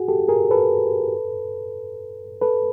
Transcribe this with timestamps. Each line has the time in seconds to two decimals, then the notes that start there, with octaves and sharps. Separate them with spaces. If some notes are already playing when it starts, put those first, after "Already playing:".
Already playing: F#4 G#4
0.08 G4 A4
0.29 G#4 A#4
0.51 A4 B4
2.42 A4 B4